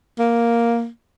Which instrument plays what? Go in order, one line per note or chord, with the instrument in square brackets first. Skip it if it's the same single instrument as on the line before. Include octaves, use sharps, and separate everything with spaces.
[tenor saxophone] A#3